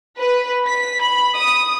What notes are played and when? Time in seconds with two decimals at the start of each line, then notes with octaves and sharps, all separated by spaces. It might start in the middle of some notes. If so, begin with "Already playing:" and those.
0.18 B4
0.66 B6
1.02 B5
1.35 D#6